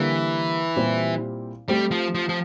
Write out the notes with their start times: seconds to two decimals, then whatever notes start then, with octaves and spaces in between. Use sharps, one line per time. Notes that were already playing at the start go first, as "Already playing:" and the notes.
Already playing: D3 E3 G3 A#3
0.76 A#2 G3 C4 E4 G4
1.68 G3 A3 C4 G4 C5
1.91 F3
2.14 F3
2.29 F3